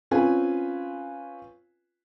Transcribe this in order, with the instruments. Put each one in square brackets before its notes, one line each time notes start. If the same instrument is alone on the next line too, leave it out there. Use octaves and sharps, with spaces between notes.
[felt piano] C4 C#4 F4 B4 G#5